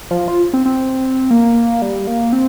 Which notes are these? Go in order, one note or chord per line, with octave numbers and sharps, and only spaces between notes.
F3
F4
C4
C4
A#3
G3
A#3
C4